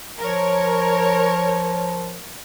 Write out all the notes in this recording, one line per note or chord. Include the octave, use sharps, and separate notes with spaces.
F3 A#4 C#5